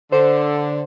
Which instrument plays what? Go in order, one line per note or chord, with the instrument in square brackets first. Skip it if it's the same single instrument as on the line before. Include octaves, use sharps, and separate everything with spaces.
[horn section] D3 [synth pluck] C5